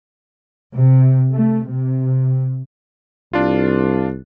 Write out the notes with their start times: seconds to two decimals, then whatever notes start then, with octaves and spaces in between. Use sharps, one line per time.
0.76 C3
1.32 A3
1.67 C3
3.33 C2 D4 F4